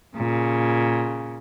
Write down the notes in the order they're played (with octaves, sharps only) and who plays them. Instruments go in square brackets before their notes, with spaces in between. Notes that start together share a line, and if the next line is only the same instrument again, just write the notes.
[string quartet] A#2 C#3